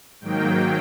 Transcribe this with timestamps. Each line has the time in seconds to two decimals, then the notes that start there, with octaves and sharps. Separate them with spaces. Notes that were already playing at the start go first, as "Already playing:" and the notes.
0.21 G#2 D#3 F#3 A#3 G5